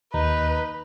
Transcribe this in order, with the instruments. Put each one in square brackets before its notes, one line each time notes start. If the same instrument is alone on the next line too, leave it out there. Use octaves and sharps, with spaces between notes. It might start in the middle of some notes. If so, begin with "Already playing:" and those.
[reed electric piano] D#2 [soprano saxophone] D#4 [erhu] B4